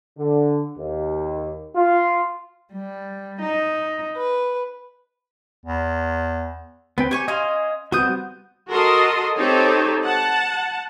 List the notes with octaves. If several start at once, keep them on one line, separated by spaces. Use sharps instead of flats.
D3
D#2
F4
G3
D#4
B4
E2
B3 C4 B4 G5
G4 C#5 G#5 C#6
C#4 D#5 F5 G#5 C6
G3 B3 C4 F#4 D#6 G6
F#4 A4 A#4 D#5 C6
C4 D#4 G4 A4 C#5
F#5 A5